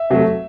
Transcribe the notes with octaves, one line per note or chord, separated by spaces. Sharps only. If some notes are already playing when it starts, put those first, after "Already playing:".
Already playing: E5
C3 F#3 A3